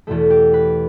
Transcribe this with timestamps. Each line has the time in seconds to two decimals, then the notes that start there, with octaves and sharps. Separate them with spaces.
0.07 E2 B2 A3 A4
0.30 G4
0.54 B4